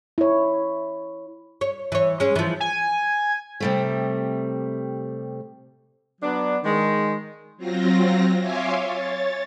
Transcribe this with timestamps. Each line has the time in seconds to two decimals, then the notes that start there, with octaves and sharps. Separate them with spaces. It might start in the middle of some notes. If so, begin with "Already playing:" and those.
0.18 E4 C#5
1.61 C#5
1.92 E3 C#5
2.20 G#3 C#4
2.36 E3 F3
2.60 G#5
3.60 C3 G3 A3
6.21 F#3 B3 D4
6.64 D#3 G#3
7.57 F#3 C4 F4 A#6
8.39 C#5 E5 F5 G#5 C6 D6
8.81 C#5 A6